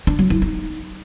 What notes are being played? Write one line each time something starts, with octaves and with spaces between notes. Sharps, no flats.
D4
F#3
E4
D#4